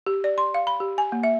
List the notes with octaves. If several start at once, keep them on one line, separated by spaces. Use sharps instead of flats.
G4
D5
C6
F5
B5
G4
G#5
A#3
E5